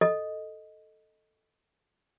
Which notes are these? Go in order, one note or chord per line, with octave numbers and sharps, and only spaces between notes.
A4 D#5